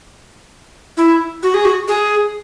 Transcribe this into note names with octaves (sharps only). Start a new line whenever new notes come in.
E4
F#4
G#4
F#4
G#4